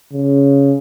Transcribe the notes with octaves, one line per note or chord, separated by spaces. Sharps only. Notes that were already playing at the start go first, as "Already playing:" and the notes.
C#3